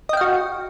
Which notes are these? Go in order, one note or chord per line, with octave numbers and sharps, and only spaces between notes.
F#4 D#5 F5 G5